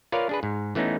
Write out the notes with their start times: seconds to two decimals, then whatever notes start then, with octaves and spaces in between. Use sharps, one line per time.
0.12 F4 A#4 B4 C#5 D5 F5
0.29 D4 G#4 B4
0.43 G#2
0.75 E3 A3 B3 C#4 D#4